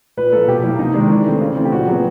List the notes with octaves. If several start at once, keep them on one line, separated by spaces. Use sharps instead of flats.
A#2 B4
F3 A#3 A4
B2 G4
F#3 A#3 E4
C3 D#4
D#3 G#3 D4
E3
A3 C4
C#3
E3 A3 C4
G4
A#2 F#4
F#3 B3 G#4